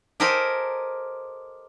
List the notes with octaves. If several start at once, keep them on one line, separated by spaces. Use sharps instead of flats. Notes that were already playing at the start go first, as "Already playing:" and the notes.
G4 A4 A#4 C5 D#5 G#5